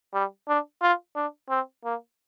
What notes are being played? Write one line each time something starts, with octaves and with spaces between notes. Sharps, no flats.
G3
D4
F4
D4
C4
A#3